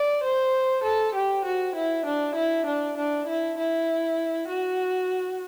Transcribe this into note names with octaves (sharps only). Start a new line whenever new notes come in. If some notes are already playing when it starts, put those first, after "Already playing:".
Already playing: D5
C5
A4
G4
F#4
E4
D4
E4
D4
D4
E4
E4
F#4